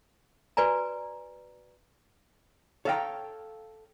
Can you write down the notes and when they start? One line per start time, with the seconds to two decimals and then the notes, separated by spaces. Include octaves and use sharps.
0.57 F#4 B4 D5 G#5 A#5
2.85 A4 C#5 F5 G5 A#5